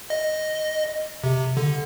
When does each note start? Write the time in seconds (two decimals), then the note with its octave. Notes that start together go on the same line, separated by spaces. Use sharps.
0.10 D#5
1.24 C3
1.57 D3